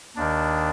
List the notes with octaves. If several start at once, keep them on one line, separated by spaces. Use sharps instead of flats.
D#2 D#3 D4